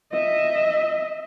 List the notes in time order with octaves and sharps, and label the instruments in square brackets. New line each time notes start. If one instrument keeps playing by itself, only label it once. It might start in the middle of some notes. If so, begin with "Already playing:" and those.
[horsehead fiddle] D#5 E5